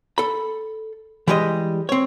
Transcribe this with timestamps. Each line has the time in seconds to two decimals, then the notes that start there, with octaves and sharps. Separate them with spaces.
0.18 A4 B5
1.27 E3 G3 G#3 G4 C#5 D#5
1.89 C4 C#5